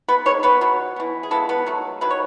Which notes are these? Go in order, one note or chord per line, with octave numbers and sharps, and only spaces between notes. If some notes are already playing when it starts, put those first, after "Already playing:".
B3 B4
D#3 G#3 C#5
B3 B4
B2 F#3 B3
E3 B3
G#4
C#3 E3 G#3 B3 A4
B3 B4
D#3 F#3 A3
D#3 F#3 B4
C#5